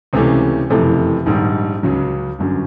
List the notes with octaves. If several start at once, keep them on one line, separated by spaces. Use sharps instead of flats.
C#2 C3 E3 A3 C#4
F#1 F2 C3 E3 A3
A#1 G#2 D#3 G3
C#2 C#3 F#3
G1 F#2 D3